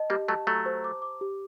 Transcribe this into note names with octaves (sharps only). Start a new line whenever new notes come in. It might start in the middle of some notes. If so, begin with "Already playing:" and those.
Already playing: D#5 A5
G3 A#3 G4
F#3 A3 A5
F#3 A3 A#5
C5
D6
D6
G4